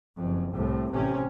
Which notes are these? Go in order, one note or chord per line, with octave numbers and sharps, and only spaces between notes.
F#1 F2
C2 A2
A1 C3 C#4